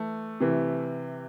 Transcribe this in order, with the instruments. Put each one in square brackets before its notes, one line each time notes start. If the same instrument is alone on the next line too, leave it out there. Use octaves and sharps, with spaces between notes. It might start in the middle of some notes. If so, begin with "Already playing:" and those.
Already playing: [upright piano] E3 A3
C3 E3